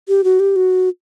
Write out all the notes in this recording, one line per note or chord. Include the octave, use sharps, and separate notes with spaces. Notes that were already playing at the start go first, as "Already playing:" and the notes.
G4
F#4
G4
F#4